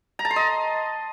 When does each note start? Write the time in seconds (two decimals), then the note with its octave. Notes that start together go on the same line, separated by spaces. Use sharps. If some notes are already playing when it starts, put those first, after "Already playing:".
0.19 A#5
0.25 A5
0.30 C6
0.36 D#5